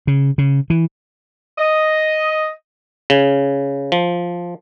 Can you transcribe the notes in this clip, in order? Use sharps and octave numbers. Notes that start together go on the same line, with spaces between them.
C#3
C#3
E3
D#5
C#3
F3